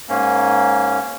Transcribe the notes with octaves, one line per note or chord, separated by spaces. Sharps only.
G#2 A#3 C#4